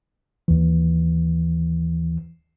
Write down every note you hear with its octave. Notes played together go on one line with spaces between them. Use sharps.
D#2 E3